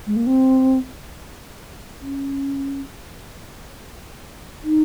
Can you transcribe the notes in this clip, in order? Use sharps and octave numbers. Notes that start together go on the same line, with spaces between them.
G#3
A#3
C4
C#4
D#4